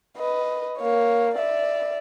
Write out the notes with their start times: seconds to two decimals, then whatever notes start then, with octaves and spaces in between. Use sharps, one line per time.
0.17 B4 D#5
0.78 A#3 C#5
1.35 D5 E5